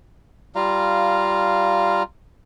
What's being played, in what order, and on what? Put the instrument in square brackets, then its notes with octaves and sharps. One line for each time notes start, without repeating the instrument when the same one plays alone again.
[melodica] G3 F4 F5 A#5